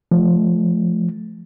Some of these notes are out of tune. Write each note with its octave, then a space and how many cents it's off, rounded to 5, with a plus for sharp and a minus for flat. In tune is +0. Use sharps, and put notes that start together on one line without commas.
F3 +0 A3 -25